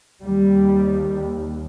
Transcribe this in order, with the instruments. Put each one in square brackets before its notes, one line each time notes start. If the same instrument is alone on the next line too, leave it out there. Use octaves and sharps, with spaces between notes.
[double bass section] D#2 G3